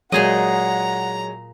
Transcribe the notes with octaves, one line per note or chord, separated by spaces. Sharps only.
A#2 F#3 G#3 G#4 D#5 F#5 A#5